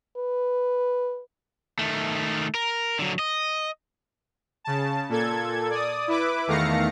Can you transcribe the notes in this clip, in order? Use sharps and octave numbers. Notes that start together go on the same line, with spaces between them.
B4
D#3 A3
A#4
D3 F#3
D#5
C#3 A5
A#2 A4 G#6
D5 D#6
E4 B4 D6
E2 D#3 A3 F5 A#6 C#7